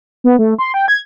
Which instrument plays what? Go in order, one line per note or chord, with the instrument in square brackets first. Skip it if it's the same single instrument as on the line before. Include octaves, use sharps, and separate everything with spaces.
[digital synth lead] B3
A3
C6
G5
G#6